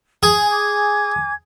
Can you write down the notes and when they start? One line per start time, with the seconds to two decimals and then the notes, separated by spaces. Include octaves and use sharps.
0.23 G#4 G#5
0.50 G#5 D6 G#6